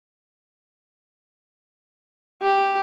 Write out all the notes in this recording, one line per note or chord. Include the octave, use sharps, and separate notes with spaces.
G4